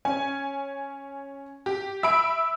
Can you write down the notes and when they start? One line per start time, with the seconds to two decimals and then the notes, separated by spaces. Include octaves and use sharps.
0.05 C#4 G#5
1.66 G4
2.03 E5 B5 E6 D7